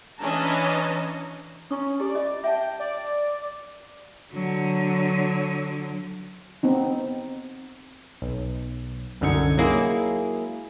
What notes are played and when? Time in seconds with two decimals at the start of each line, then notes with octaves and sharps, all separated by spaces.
0.19 E3 C#4 D4 D#5 A5 A#5
1.71 C#4 E4 C#6 D#6
2.00 E4 G4 A4 D5
2.15 C#4 F4 D#5
2.44 E5 F#5 G5 A5
2.80 D5
4.33 D3 F#3
6.63 B3 C4 D#4
8.22 B1
9.21 C2 F#2 D3 D#4 G#6 C#7
9.57 F#3 G#3 A#3 E4 G#4